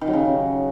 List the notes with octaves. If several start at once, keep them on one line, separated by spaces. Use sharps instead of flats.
D#3
F#3
C#3